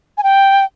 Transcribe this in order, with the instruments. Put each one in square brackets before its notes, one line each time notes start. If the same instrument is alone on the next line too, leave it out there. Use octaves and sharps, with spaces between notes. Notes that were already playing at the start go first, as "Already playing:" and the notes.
[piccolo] G#5
G5